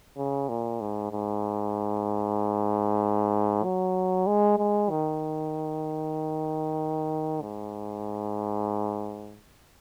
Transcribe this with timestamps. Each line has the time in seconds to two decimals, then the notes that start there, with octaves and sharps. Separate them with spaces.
0.17 C#3
0.49 A#2
0.81 G#2
1.12 G#2
3.64 F#3
4.27 G#3
4.59 G#3
4.90 D#3
7.42 G#2